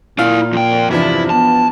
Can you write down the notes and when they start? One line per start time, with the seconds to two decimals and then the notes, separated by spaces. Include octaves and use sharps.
0.19 A#2 E4 D5 F5
0.53 F2 G5
0.91 E2 G2 C3 F3 D4 E4
1.30 B3 A5